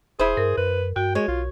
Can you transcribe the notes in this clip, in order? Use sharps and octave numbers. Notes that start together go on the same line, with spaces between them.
E1 E4 G#4 C5
G2 A#4
F#2 B4
G2 F#4 G5
G#3 C#5
B1 F4